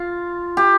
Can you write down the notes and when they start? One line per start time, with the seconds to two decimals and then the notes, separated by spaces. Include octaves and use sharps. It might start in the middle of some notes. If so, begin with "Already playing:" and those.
Already playing: F4
0.57 G4